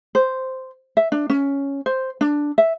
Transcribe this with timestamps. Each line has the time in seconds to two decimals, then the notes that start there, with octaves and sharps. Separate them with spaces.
0.15 C5
0.97 E5
1.12 D4
1.30 C#4
1.86 C5
2.21 D4
2.58 E5